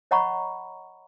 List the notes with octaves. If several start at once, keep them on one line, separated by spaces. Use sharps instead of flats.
C#5 D#5 F#5 A#5 B5 C#6